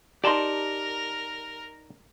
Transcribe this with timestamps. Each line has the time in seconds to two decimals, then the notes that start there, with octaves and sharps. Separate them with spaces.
0.24 D#4 G4 A#4 D5 A5 C6